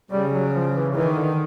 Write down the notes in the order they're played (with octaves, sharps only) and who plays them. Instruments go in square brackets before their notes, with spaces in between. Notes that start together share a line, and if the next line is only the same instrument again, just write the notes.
[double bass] C#3 [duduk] G3
[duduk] F#3
F3
E3
[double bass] D#3 [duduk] E3
[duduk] D3